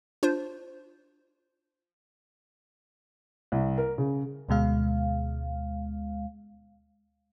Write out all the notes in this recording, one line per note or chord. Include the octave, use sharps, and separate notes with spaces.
D4 F4 C5
C2
A#4
C#3
D2 B2 G#3 F5